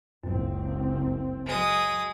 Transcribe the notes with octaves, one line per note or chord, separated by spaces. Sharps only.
F#1 C#2 F#2 C4
F#3 G#3 D#6